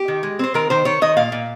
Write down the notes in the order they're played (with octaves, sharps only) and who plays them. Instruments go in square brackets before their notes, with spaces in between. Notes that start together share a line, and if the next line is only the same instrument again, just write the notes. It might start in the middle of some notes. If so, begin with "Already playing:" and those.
Already playing: [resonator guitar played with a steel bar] G4
D#3
G#3
C4 C5
D#3 A#4
D#3 C5
D#3 C#5
D#3 D#5
A#2 F5
A#2